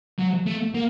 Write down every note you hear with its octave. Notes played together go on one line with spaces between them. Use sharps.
F#3
A3
A#3